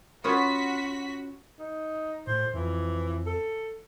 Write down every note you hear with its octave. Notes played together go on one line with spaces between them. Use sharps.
B3 C#4 F4 F#4 B6
D#4
A2 C5
F2 E3
A4